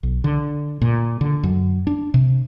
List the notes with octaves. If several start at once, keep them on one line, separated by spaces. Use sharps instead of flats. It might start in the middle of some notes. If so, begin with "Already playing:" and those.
B1
D3
A#2
D3
F#2
D4
C3